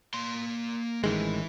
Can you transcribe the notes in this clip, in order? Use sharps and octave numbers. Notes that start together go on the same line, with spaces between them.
A#3 C6
A1 D#3 E3 G#3